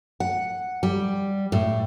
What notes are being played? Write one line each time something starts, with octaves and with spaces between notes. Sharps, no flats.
F#5
G3
A2